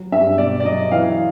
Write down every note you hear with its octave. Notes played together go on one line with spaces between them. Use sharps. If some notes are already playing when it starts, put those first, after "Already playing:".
Already playing: F#3
G2 E5
B2 D5
D5
F#3 D#5
E3 F5